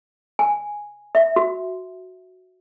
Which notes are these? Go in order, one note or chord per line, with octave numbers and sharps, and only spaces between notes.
G#5
E5
F#4